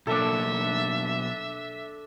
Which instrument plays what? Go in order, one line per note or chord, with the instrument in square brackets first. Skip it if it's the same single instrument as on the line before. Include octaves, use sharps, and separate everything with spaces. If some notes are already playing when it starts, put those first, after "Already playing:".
[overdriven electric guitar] B1 A#3 [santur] D4 A4 [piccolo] E5